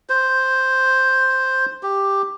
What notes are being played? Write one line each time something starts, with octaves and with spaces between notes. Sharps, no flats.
C5
G4